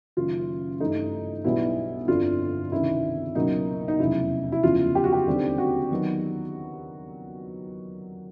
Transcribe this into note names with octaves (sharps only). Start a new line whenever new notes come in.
F#1 F#2 D#3 F4
G2 E3 A3 D#4
B1 B2 G3 B3 E4
G1 F2 D3 F4
C#2 C3 D#3 E4
C#2 B2 F#3 A#3 D#4
D#4
F1 E2 C#3 F#3 E4
E4
F#1 E2 C#3 F3 F4
G4
F#4
G4
D#2 D3 G3 C4
F#4
D#3 F#3 B3